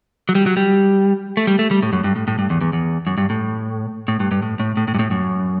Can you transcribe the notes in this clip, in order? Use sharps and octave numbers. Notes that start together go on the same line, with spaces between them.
F#3
G3
F#3
G3
A3
G3
A3
G3
A2
F#2
G2
A2
A2
G2
E2
E2
E2
F#2
G2
A2
A2
G2
G2
A2
A2
A2
A2
G2
A2
F#2